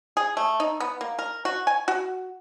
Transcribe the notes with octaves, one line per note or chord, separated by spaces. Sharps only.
G#4
A3
D#4
B3
A#3
A#4
F#4
G#5
F#4